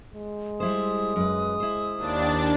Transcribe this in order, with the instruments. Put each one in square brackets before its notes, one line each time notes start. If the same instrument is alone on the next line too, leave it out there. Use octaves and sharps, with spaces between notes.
[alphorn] G#3
[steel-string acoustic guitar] G3 E4 C5 [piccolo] D#6
[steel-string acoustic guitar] F#2 B4
E4 C5
[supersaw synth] D#2 D4 A6